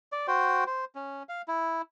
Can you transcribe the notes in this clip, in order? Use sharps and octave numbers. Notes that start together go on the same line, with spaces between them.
D5
F#4 C5 G5
C5
C#4
F5
E4